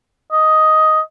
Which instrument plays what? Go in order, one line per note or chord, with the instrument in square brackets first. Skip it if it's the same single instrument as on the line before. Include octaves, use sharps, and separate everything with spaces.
[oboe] D#5